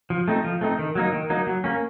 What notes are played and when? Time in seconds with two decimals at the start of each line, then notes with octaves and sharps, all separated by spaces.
0.10 F3
0.28 A3 C4 D#4
0.44 F3
0.61 A3 C4 D#4
0.79 D#3
0.95 F#3 A#3 D#4
1.12 D#3
1.30 F#3 A#3 D#4
1.47 F#3
1.64 A#3 C#4